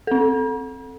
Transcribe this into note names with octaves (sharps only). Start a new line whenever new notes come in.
C4 A4